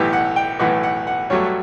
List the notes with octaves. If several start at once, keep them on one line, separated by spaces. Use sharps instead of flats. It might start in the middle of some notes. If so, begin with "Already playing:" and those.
Already playing: B1 A2 E3 B3 G4
F#5
G5
B1 A2 E3 B3 F#5
F#5
F#5
G2 F#3 A3 C#5